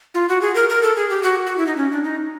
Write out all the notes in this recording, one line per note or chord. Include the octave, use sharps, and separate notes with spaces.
F4
F#4
G#4
A#4
A#4
A4
G#4
G4
F#4
F#4
E4
D#4
C#4
D4
D#4